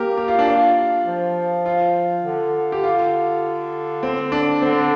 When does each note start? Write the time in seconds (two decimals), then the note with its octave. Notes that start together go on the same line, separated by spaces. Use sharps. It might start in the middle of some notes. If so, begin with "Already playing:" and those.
Already playing: A#3 G4 A#4
0.17 G4
0.28 F4
0.39 D4
0.49 F4
1.06 F3
1.66 F4
2.25 D3
2.72 G4
2.84 F4
4.03 C4
4.32 D4
4.62 D3 C4